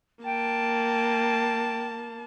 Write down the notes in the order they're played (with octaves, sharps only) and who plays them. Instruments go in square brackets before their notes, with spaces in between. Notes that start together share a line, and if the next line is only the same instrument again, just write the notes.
[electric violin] A#3 A5 [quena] G5